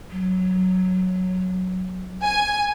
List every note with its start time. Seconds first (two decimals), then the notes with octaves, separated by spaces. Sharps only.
0.11 F#3
2.24 G#5